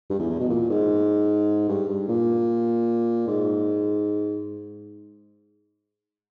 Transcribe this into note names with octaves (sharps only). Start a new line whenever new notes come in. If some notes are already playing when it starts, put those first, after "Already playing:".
G2
E2
E2
B2
A#2
G#2
G2
G2
A#2
G#2